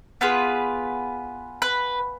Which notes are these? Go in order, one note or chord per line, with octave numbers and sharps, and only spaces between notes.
B3 F4 G#4 B4
B4